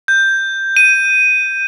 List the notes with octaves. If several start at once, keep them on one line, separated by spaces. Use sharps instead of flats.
G6
D#7